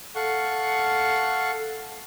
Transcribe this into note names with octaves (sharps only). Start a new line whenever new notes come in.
A4 F5 F#5 C#6